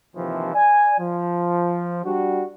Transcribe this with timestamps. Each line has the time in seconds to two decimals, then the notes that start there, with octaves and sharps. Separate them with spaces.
0.15 D#2 C3 E3 F3
0.54 D5 G#5
1.00 F3
2.04 G3 D4 F#4